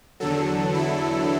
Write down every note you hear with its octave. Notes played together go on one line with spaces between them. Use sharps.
E2 D3 F#3 A4
E4